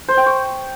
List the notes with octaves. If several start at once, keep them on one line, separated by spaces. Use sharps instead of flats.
C5
G5
C#6